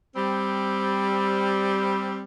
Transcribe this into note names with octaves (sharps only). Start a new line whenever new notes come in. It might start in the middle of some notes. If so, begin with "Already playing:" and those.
G3 C4